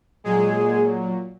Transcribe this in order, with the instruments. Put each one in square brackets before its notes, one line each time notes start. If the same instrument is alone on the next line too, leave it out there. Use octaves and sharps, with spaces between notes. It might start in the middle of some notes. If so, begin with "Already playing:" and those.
[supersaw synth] A#2 F#3 G#3 G#4